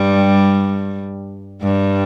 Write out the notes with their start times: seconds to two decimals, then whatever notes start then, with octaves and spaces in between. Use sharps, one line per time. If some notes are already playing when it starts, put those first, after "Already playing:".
Already playing: G2 G3
1.63 G2 G3